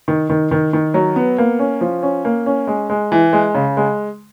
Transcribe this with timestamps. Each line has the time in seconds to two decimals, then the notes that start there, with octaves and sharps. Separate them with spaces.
0.08 D#3
0.30 D#3
0.51 D#3
0.73 D#3
0.94 F#3
1.16 B3
1.38 A#3
1.59 C#4
1.81 F3
2.03 C#4
2.25 A#3
2.46 C#4
2.67 G#3
2.90 G#3
3.12 E3
3.33 G#3
3.55 C#3
3.77 G#3